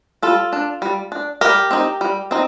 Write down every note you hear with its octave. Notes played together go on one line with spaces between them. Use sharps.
G3 F4 A4
D4
G3
D4
G3 G4 A#4
C4 D#4
G3
C4 D#4